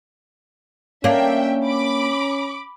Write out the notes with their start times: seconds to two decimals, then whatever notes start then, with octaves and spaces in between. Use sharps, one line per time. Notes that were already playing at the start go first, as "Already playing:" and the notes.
1.04 A#3 C#4 D4 C#5 E5 F5 G5
1.64 B5 D6